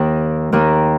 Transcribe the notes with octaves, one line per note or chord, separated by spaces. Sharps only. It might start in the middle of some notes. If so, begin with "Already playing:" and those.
Already playing: D#2 D#3 A#3 D#4
D#2 D#3 A#3 D#4